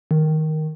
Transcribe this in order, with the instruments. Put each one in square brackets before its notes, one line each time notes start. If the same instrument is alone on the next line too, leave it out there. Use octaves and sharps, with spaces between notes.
[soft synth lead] D#3